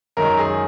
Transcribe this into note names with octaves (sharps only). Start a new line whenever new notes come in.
F#2 D#3 G#3 A#4
G#4